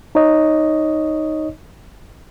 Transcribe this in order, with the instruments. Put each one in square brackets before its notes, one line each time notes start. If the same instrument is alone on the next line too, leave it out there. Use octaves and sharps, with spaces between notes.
[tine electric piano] D#4 C#5 D#5